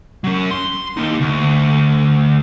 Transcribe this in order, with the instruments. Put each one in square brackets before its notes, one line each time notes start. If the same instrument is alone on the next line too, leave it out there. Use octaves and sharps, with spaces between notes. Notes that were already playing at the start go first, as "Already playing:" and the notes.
[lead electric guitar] F#3 C#4
C6
A#3 D#4
D2